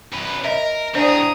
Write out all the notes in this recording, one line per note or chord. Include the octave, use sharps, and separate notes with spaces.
F#2 B4
A#4 D#5 E5
A2 D4 G#4 C5 D5 A#5 D#6